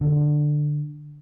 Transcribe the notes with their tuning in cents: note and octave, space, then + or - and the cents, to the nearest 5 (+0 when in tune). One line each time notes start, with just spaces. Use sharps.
D3 +15